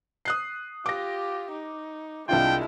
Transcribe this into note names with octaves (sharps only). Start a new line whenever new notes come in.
D#6 F#6 C7
F4 G4 D6 A#6
D#4
C2 G#3 D4 E4 F4 G5